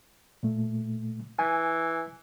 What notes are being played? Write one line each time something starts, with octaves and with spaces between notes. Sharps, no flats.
A#2 A3
E3 G#5